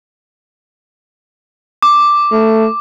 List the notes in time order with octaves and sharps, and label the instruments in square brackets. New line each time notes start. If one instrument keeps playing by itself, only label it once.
[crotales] D6
[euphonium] A3